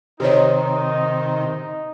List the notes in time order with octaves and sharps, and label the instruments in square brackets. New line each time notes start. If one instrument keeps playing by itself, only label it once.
[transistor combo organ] C3 D#3 [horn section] D#4 [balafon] G4 C5 C#5